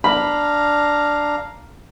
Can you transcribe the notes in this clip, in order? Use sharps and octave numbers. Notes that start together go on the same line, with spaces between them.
D4 F5 A#5 B5